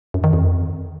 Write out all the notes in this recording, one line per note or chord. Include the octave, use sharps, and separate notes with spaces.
F#2
D#3
F2